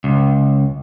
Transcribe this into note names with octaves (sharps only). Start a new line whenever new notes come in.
C#2